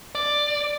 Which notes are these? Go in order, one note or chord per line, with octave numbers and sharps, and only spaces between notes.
D5